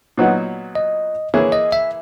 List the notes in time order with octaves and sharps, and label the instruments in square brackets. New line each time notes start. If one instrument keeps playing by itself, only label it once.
[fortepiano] A#2 F#3 B3 D#4 F#4
[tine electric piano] D#5
[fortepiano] E3 A#3 E4 G#4 [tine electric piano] C#5
[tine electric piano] D#5
E5